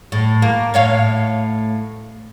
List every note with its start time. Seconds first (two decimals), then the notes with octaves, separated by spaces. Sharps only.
0.12 A2
0.42 A#3
0.74 A2 C#5 F5